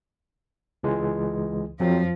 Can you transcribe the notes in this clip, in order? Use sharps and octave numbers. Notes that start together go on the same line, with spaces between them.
C#2 E3 G#3
F2 F3 F#3 C4